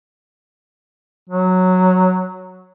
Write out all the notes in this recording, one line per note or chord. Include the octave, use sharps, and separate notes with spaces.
F#3